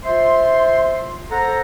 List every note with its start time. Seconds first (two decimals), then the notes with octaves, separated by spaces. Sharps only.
0.04 F4 C5 E5 C6
1.31 A4 C5 F#5 A#5